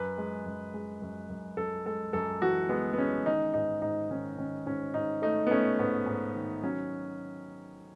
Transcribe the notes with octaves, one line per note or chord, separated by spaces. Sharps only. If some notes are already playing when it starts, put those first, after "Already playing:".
Already playing: F#2 B4
G#3
F#2
G#3
F#2
F#2
F#2 A4
G#3 A4
F#2 A4
E3 F#4
G#3 B3
B3
G#3 C#4
D#3 D#4
G#2 D#4
G#2 D#4
D#3 C#4
D#3 C#4
G#2 C#4
G#2 D#4
A3 D#4
B3
A3 C#4
G#2 B3
G#2
D#3
F#3 C#4